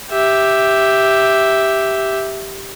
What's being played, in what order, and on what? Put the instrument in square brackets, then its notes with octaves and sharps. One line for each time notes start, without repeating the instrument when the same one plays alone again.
[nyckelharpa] G4 E5